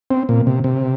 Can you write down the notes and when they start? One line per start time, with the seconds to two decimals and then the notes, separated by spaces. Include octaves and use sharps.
0.11 C4
0.29 A#2
0.47 C3
0.64 C3